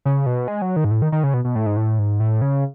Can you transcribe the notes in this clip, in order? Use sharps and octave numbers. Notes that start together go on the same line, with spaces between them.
C#3
B2
G#3
F#3
D#3
G#2
A2
D#3
D#3
C#3
B2
B2
A2
G#2
A2
G#2
A2
C#3